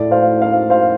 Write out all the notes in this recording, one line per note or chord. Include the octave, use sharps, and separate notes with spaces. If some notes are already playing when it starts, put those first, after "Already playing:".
Already playing: A2 A3 D5
C5 F5
C5 F5
C5 F5